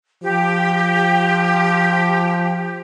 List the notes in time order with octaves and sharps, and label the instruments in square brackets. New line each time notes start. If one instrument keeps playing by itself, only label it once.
[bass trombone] F3 [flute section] G4